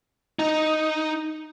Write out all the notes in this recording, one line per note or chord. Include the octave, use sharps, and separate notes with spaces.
D#4